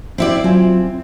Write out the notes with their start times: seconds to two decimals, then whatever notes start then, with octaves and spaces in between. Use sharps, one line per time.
0.18 C4 E4 D5
0.44 F#3 C4 F4 G#5